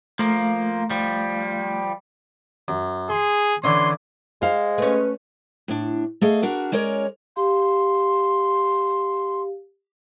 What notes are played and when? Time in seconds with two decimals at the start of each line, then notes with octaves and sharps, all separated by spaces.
0.19 F3 A3 A#3
0.90 F3 G3
2.68 F#2
3.10 G#4 C6
3.64 D3 E3 C#4 C6
4.42 G#3 C5 F5
4.78 A3 C#4 B4
5.68 A2 D4
6.22 A3 G#4 D#5 F5
6.42 D4 F#4 A#4
6.72 G#3 C#4 A#4 C#5 D5
7.36 G4 F5 C6